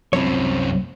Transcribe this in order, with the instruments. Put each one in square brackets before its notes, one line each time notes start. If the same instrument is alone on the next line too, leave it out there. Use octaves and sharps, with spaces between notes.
[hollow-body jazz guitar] C2 C#5 [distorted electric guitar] F#2 C4